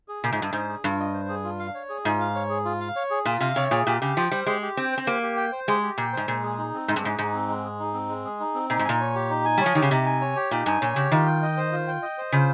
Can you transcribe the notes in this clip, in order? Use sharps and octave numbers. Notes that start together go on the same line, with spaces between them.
G#4
A#2 F4
G#2
G2 D#5
G#2 C5
G#4
G2 F4
D#5
C5
G#4
F4
F5
C#5
G#4
G#2 F4
F5
C#5
G#4
F4
F5
C#5
G#4
A#2 F4
C3 F5
C3 C#5
A#2 G#4
A#2 G4
C#3 G4
F3 G5
G3 C5
G#3 G4
G4
C4 G5
C5
C4
A#3 G4
G4
G5
C5
G#3 G4
G4
A#2 G5
G#2 C5
A#2 G#3
G#4
D#4
C4
G#2 G#3
G2
G#2 G#4
G#2 D#4
C4
G#3
G#4
D#4
C4
G#3
G#4
D#4
C4
A#2 D#4
G#2
A#2 G#5
C#5
G4
D#4
G#5
G3
F3 C#5
D#3 G4
C#3
C3 D#4
G#5
C#5
G4
A#2 D#4
G2 G#5
A#2 C#5
C#3 G4
D#3 F4
G5
D#5
C5
F4
G5
D#5
C5
C#3 F4